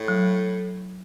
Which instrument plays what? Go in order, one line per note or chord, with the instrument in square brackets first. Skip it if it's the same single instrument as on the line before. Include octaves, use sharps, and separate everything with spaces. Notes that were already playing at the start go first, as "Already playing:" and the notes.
Already playing: [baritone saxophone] A2
[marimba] F#3